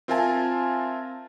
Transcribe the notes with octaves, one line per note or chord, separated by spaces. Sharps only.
C4 F4 A#4 E5 G#5 A5